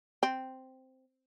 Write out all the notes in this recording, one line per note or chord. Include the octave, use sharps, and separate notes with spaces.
C4